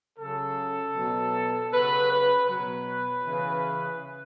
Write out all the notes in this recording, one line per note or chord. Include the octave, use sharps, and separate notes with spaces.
C#3 F#3 A4
B2 F#3
C#3 F#3 B4
B4
B2 F#3 B4
C#3 E3